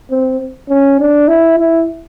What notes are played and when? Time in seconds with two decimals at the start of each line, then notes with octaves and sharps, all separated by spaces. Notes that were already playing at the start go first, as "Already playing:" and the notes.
0.10 C4
0.69 C#4
0.99 D4
1.28 E4
1.58 E4